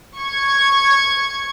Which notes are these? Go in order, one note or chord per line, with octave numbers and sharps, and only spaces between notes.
C#6 G#6